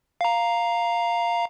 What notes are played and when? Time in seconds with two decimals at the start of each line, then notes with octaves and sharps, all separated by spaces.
0.21 F5 A#5